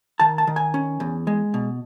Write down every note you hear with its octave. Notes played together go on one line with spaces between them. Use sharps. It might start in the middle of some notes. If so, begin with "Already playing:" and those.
D#3 A5
A5
D#3
G#5
C#4
E2
G#3
B2